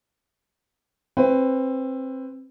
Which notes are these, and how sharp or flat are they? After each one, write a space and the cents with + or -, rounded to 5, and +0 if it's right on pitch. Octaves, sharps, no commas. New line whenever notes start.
C4 +20 B4 +25